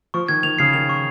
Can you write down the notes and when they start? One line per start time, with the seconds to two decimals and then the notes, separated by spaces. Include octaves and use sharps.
0.14 F3 C#6
0.28 D#3 G#6
0.43 D#3 F7
0.59 C#3 C7
0.73 D#3 F7
0.89 C#6